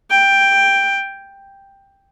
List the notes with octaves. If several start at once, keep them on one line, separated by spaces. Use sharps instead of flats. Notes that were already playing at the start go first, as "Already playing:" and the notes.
G5